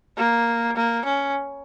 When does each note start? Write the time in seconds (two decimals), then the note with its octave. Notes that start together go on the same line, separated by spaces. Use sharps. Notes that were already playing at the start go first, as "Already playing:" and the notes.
0.17 A#3
0.76 A#3
1.05 C#4